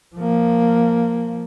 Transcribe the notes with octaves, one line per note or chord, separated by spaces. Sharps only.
F3 A#3